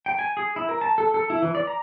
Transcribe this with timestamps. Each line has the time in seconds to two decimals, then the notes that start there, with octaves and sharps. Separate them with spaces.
0.06 G5
0.19 G#5
0.37 G#4
0.56 E4
0.69 A#4
0.81 A5
0.98 A4
1.14 A4
1.30 E4
1.42 E3
1.55 D5
1.67 A#5